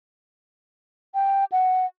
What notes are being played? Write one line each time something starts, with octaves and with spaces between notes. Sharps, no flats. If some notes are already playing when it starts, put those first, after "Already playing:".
G5
F#5